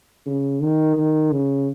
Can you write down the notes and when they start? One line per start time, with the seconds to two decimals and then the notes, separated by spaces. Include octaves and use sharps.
0.26 C#3
0.62 D#3
0.97 D#3
1.31 C#3